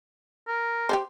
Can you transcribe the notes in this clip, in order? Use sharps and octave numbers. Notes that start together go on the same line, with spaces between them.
A#4
G4 A4 C5